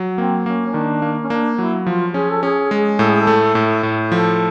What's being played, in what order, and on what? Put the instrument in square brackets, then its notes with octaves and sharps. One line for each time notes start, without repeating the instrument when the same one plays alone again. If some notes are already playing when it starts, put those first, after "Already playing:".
Already playing: [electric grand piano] F#3
[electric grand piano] A#3 [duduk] C4
[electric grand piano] A#3 [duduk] C#4
[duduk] C#4
[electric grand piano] D#3 [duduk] D4
[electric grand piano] A#3
[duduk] C#4
[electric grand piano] A#3 [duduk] D4
[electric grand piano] F#3 [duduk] E4
[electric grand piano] F3 [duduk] F4
[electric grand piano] C#4 [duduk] G#4
[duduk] A4
[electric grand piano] C#4 [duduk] G#4
[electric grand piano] G#3
[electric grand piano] A2 [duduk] A4
[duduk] G#4
A4
[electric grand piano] A3
A2
A2
[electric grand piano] F3 [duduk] A4